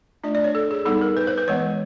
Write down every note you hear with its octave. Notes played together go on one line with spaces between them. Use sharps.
A3 D4 F4 D5
D5
C#5
A4
G#4
G3 B3 D#4 A4
A#4
B4
C5
B4
E3 G#3 B3 C#5